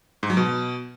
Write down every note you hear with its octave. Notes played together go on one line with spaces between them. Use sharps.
G#2
F#3
B2